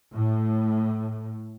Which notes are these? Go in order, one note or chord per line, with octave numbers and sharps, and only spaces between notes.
A2